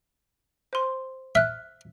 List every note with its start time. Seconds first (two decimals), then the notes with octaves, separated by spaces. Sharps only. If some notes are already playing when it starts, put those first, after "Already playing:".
0.73 C5 C6
1.35 E5 F6 F#6